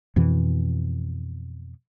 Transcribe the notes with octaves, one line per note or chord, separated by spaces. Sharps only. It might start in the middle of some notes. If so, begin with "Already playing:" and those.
F2 B2 E3